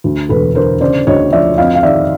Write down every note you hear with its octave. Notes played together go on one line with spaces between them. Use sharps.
D2
E1 A4 B4
D3 A#4 C5
C#3 C5 D5
D2 C#5 D#5
F3 D5 E5
F2 D#5 F5
F5
D#3 D5 E5